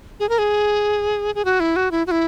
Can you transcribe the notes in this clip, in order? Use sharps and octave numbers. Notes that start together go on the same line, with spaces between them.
G#4
A#4
G#4
G#4
F#4
E4
F#4
E4
F#4
E4